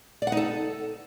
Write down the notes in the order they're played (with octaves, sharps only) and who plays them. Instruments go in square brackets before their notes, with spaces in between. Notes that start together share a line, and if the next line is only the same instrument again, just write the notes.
[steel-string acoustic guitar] D5
F#5
D#4
A4